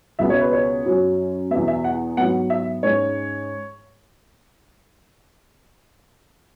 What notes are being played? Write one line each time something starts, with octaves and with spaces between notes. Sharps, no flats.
C#2 B2 G#3 B3 E5
C#5
B4
C#5
F#2 F#3 C#4
E2 B2 B3 E5
E5
F#5
G#2 F#3 B3 F#5
E5
G#2 G#3 C#4 C#5